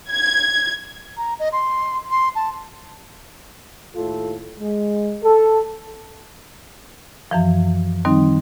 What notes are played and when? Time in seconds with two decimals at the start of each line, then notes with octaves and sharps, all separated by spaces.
0.11 G#6
1.17 A#5
1.39 D#5
1.52 C6
2.11 C6
2.35 A5
3.96 D#2 A2 F4 A4
4.59 G#3
5.23 A4
7.31 F#2 E3 F3
8.05 D#3 G3 C4 D#4